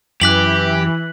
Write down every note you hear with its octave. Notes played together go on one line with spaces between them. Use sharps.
F#2 E3 G4 F#6 B6 F#7